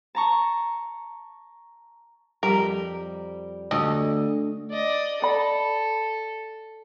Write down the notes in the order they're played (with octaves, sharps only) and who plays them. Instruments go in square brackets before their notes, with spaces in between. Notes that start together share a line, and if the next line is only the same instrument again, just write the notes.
[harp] A5 A#5 C#6
[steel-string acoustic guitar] F2 G3 [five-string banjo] A#4
[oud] D2 [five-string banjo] D#5
[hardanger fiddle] D5 D#5
[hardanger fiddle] A4 [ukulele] D5 B5